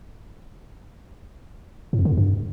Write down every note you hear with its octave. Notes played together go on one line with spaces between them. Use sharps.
A2
F2
D3
E2
G2